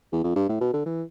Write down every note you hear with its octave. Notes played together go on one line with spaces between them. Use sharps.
E2
F2
G2
A2
B2
D3
E3